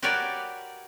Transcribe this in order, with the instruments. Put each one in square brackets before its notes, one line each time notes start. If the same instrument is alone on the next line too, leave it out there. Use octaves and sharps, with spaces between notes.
[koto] F#4 G4 A#4 B4 C#5 D5